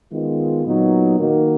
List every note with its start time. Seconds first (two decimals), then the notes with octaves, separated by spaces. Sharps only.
0.11 D#3 G#3 B3 F4
0.65 A#2 F#3 B3 D#4
1.19 D#3 A#3 D#4 F#4